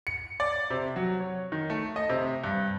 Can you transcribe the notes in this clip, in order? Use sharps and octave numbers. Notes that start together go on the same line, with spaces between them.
C#7
D5
C3
F#3
C#5
D#3
A3
D#5
C3
G2